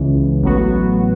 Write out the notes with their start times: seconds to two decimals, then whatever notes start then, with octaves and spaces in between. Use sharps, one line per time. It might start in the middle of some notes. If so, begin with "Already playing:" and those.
Already playing: C#2 C#3 E3
0.43 A1 A2 F#3 B3 F#4